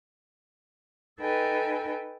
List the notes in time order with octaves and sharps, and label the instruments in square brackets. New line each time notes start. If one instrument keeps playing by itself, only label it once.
[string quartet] D#4 A4 B4 E5 G5 G#5